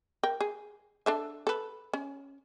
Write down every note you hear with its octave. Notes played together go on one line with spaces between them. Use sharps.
A#4 G5
G#4
D4 A4 E5
A4 B4
C#4